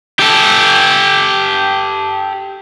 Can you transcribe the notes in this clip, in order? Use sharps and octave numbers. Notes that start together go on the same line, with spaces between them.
G4 A4